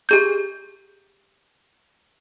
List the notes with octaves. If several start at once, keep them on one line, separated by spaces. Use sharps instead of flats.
G4 G#4 G6